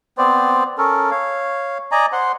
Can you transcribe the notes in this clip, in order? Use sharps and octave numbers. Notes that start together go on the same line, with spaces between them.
B3 C4 C5 D5
C#4 A4 A#4
C#5 F5
D5 D#5 G#5 A#5
C5 F#5 C6